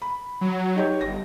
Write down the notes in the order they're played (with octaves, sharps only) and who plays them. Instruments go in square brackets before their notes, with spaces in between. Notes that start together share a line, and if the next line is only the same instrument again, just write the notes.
[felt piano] B5
[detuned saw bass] F#3
[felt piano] D#4 G4 C#5
[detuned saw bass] G1 [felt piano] A#6